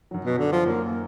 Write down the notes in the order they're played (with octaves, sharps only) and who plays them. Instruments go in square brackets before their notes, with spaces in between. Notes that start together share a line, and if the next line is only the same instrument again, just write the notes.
[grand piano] F#2 D#3 F#3
[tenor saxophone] B2
D3
F3
[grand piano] F#2 D#3 F#3 [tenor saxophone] A#3
[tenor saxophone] A#3